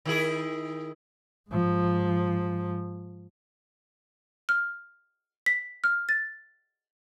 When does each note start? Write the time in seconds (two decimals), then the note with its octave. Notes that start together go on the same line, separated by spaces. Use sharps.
0.05 D#3 E4 G#4
1.50 G#2 F3
4.49 F6
5.46 B6
5.84 F6
6.09 A6